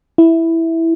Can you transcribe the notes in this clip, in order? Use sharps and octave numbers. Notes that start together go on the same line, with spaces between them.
E4